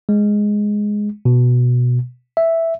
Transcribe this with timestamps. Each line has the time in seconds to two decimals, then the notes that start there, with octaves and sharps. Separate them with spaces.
0.09 G#3
1.25 B2
2.37 E5